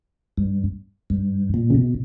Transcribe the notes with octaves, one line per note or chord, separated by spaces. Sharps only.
G2
G2
A#2
C#3
B2